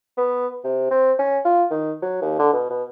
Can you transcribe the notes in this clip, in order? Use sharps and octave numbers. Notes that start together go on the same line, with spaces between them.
B3
C3
C4
C#4
F4
D#3
F#3
D#2
D3
B2
B2